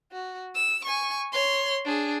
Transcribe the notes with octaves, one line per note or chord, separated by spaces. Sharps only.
F#4
E6
G#5 C#6
C#5 C6
D4 G#4